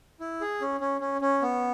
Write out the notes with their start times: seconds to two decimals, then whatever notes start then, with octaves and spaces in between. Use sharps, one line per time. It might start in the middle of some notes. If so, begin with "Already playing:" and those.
0.20 E4
0.41 G#4
0.61 C#4
0.81 C#4
1.01 C#4
1.21 C#4
1.42 B3